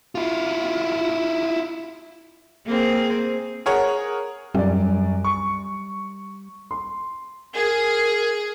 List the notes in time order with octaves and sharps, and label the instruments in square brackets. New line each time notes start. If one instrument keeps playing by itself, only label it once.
[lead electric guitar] E4 F4
[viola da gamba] A#3 C4 G#4
[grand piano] G#4 A#4 C#5 F#5
[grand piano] F#2 D5 [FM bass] G3
[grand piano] C#6
C6
[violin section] G#4 [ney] A#4